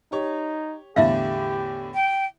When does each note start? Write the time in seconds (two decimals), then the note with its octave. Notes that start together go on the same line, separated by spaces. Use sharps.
0.12 D#4 G4 C#5
0.96 E2 A2 D3 E4 G4 E5 F5
1.94 G5